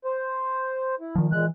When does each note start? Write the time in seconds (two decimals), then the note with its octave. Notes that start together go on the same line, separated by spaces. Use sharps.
0.04 C5
1.01 E4
1.15 A#2 D#3 F3
1.32 A#2 E3 G#3 F#6